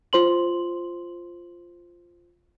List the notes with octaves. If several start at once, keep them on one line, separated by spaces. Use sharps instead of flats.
F4 C5 C6 F#7